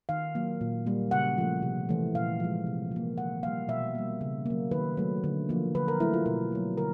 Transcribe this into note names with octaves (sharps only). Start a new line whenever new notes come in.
D#3 F5
F#3 A#3
A#2
G3 A#3
C#3 F#5
F3 A3
C3
E3 A3
A#2 F5
F3 G#3
C3
F3 A#3
D#3 F#5
G3 A#3 F5
B2 E5
G3 A#3
C#3
F#3 A#3
D#3 B4
F#3 A3
D3
F3 A#3
D3 B4
A#4
F#3 A3 E4
F4
B2 A#4
F#3 A#3
D3 A#4